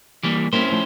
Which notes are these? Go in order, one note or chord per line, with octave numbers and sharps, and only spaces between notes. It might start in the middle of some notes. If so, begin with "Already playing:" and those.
E3 G3 A#3
G3 A#3 C4 C#4 E4 C5
F3 A3 C4